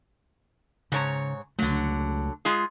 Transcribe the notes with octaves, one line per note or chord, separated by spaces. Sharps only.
G#2 C#3 C#5 A#5
C#2 D3 F#3 A3
G#3 F4 G#4